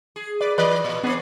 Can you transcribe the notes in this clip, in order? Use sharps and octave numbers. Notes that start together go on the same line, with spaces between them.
G#4
B4 D5
E3 B4 D5 D#5
A#2
B3 C4 D4 G#4